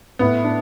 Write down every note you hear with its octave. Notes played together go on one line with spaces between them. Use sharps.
A2 B3
D4